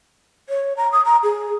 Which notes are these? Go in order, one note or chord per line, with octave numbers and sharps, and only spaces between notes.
C#5
A#5
D#6
A#5
G#4